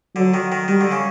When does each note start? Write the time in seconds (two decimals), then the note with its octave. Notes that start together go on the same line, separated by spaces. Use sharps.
0.16 D3 F#3
0.34 D#3
0.52 D#3
0.68 D#3 G3
0.81 D3
0.92 C#3